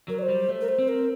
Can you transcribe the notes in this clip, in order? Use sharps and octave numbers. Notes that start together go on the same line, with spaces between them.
F#3 A#4
D5
C5
G3
A3
A#4
C5
C4
A#4